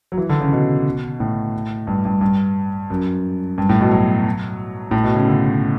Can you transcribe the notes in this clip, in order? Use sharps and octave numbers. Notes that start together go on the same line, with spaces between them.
F#3
E3
D3
C#3
B2
A2
G2
G2
G2
F#2
G2
A2
B2
F#3
A2
B2
C#3
D3